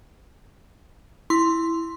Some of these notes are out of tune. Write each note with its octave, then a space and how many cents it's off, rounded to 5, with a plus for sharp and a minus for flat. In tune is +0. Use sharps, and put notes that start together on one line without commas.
E4 +0 C6 +0